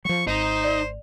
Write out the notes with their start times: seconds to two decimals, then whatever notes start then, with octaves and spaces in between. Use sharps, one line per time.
0.05 F3 F#3 C#6
0.27 G#1 D#4 C5
0.64 D5